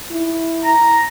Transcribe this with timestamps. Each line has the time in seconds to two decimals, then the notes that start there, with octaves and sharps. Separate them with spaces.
0.11 E4
0.65 A#5